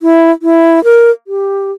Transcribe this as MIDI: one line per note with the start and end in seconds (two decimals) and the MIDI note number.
0.02 0.31 64
0.42 0.83 64
0.84 1.11 70
1.27 1.71 67